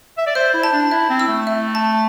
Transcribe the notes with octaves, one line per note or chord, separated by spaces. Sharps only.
E5
D5
C5 E5
E4
A5
D4
E4 E5
C4
E6
A3
E5
A5